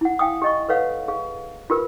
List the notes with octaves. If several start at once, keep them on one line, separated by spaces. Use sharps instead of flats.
E4 F#5
F5 G5 G#5 D#6
G4 D#5 C#6
A4 B4 C#5 F5 F#5
G#4 F5
F4 G4 A#4 B4